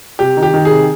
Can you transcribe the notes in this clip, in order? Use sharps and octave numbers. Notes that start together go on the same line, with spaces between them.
C3 G4
D#3
G4
D#3
G#4
C3